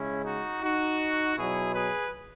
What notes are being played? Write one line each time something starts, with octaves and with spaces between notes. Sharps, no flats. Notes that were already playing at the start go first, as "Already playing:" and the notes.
Already playing: C#3 G#3 C#4 E4
D#4 F#4
D#4 F#4
B2 F#3 E4 G#4
G#4 B4